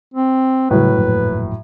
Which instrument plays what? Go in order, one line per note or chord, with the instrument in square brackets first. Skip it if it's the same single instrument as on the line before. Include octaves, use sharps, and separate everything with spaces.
[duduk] C4
[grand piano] A2 F#3 [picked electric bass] C#3 G3 [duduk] B4
[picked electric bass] G1 F2 A#2